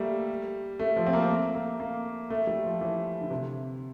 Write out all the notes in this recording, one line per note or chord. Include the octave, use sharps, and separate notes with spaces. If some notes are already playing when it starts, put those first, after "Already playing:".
Already playing: G3 A3 A#3
A3
F3
C4
A#3
A3
A#3
A#3
A3
G3
F3
E3
D3
C3